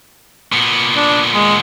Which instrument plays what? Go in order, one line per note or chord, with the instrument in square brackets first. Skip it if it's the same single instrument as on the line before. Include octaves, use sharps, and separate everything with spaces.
[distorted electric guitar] A#2 B3
[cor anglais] D4
G#3